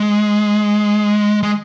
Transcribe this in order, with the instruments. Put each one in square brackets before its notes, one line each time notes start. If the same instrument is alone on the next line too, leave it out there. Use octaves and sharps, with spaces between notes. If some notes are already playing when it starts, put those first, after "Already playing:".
Already playing: [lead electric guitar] G#3
G#3